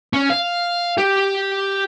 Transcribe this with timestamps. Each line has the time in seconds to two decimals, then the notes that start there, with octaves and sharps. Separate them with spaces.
0.13 C#4
0.30 F5
0.98 G4